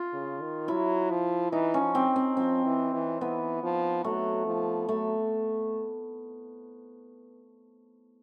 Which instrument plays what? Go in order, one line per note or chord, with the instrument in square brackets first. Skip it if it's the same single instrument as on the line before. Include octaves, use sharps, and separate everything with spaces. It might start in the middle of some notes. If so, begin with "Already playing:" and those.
Already playing: [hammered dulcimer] F4
[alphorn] C#3
D#3
[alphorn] F#3 [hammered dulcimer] E4
[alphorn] F3
[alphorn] E3 [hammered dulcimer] D#4
[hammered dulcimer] C#4
[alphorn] F3
[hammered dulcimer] C4
C4
[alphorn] F3 [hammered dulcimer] C4
[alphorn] E3
E3
[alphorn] E3 [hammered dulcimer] B3
[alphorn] F3
[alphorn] F#3 [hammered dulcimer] A3
[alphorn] F3
[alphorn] F#3 [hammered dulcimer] A3